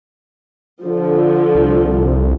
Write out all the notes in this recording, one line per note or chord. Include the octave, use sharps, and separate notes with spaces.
D3 F3
C2